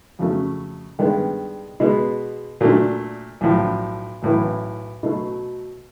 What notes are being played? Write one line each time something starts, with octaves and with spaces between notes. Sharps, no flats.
F2 C#3 F#3 A3 C#4
G2 D#3 G#3 B3 D4
B2 G#3 B3
A#2 F#3 A3 D4
B1 A2 F3
B1 A2 E3
B2 F#3 A3